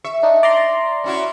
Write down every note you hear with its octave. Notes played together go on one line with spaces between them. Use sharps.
E5 C#6
D4 D#4
D5 A#5 C6
C#4 E4 F#4